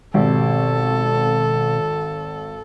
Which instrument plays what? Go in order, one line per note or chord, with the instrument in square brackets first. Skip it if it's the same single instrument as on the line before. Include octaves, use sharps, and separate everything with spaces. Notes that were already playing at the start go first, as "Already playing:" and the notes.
[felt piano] G#1 [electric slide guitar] B2 C4 G4 [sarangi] A4